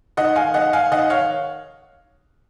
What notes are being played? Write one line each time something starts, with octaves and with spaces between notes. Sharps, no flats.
D#3 D#5 F#5
F5 G#5
D#3 D#5 F#5
F5 G#5
D#3 D#5 F#5
C#5 F5